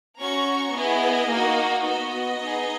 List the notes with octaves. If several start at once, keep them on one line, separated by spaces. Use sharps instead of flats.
C#4 F#4 A#5 C#6
B3 E4 G#4 D#5
A#3 D#4 F#4
B3 F#4 D#5
B3 D#4 G#4